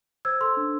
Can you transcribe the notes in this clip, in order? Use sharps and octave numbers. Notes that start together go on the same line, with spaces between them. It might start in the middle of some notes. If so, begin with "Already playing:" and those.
C5 E6 G#6
A4 C6 E6
D4